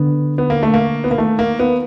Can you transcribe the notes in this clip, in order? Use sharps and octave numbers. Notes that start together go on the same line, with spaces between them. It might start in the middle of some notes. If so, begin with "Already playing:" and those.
Already playing: D3 B3
B3
A#3
A3
A#3
B3
A#3
D#3 A3
A#3
B3